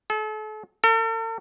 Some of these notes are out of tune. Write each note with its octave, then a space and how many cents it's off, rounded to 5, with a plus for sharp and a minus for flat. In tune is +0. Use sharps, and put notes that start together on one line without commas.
A4 -40
A4 +45